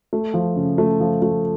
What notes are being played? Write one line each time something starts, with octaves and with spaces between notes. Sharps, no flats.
A3
F3
C#3
A3
F3
A3